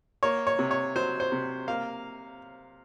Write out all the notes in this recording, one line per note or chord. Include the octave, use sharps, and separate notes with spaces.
A#3 C#5
C#5
C3
C#5
F#3 C5
C5
C3
A#3 F5